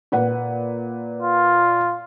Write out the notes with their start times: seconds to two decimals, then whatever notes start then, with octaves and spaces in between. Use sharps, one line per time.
0.12 A#2 B4 F#5
1.22 F4